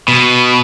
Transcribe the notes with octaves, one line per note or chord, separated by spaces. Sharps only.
B2